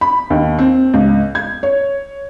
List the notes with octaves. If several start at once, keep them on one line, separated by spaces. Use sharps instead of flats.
B5
D#2
C4
C#2
G#6
C#5